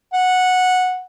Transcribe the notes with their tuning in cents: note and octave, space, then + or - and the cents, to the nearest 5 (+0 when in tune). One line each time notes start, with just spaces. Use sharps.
F#5 -10